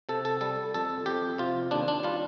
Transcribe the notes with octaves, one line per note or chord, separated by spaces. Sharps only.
C3 A4
A4
G3 A4
F2 A4
F2 G4
C3 F4
D#2 D4
D4
G3 F4